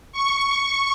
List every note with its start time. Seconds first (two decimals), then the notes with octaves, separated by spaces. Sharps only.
0.13 C#6